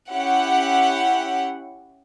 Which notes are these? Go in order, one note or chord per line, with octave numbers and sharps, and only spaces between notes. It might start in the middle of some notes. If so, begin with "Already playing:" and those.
C#4 E4 G4 F#5